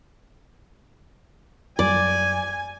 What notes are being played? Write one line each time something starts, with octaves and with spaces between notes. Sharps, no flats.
F#2 G3 D5 G#5